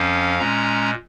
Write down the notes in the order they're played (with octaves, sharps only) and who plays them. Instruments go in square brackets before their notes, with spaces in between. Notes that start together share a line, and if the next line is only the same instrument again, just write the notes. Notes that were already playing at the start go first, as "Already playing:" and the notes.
Already playing: [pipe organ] F2 F3 C#4 F5
A#2 G#3 C#4 A#5